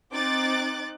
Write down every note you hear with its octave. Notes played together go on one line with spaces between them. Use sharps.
C4 D#4 D6 F#6 A6